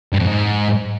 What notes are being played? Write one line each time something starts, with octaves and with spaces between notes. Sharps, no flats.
G2
F2
G#2